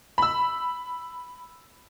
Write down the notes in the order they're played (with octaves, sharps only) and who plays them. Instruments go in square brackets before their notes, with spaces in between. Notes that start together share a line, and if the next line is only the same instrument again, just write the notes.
[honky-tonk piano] B5 E6